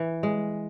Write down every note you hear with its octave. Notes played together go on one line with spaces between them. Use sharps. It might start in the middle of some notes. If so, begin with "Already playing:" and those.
Already playing: E3
G#3